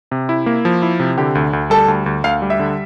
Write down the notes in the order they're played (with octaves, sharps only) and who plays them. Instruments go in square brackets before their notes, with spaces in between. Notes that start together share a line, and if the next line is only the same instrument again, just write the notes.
[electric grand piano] C3
E4
A#3
F3
E4
C3
[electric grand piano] D3 [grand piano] G4
[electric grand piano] D2
D2
[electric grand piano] G3 [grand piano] A4
[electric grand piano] D2
D2
[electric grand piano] D2 [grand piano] F5
[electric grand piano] G3
[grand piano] E5
[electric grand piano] D3